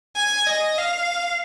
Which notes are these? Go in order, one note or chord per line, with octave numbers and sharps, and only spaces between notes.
G#5
D#5
F5